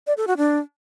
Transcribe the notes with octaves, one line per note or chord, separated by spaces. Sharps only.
D5
A4
F#4
D4